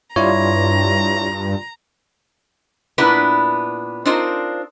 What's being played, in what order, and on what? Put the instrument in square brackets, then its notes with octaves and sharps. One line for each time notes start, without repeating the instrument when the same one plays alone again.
[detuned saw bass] G2 [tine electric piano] E4 C#5 [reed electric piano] F4 D5 C6 [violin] A#5
[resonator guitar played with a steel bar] A#2 B3 D4 E4 B4
C4 D4 D#4 F4 A#4 C5